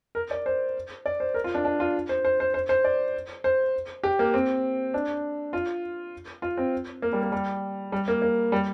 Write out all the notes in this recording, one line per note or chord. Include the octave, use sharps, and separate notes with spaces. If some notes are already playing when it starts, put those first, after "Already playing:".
A#4
D5
C5
D5
C5
A#4
F4
D4
D4
F4
C5
C5
C5
C5
C5
D5
C5
G4
A#3
C4
D4
F4
F4
C4
A#3
G3
A#3
G3
G3
A#3
A#3
G3